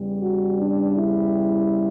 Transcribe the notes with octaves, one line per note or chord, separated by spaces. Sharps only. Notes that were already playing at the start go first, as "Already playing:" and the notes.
Already playing: E2 C#3 G3
F#4
D4
E4